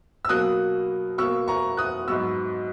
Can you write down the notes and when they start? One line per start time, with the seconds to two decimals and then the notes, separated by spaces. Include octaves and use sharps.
0.25 E6
0.29 B2 F#3 A#3 D#6 F#6
1.18 B2 A#3 C#6 E6
1.48 A#5 C#6
1.77 D#6 F#6
2.08 G#2 F#3 B3 C#6 E6